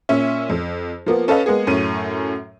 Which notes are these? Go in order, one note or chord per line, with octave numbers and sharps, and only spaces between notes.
A#2 C#4 E5
F2
F3 A#3 B3
C#4 A4 B4 D#5 F5
G#3 A#3 B3 G#4
F#2 A2 C#4 D#7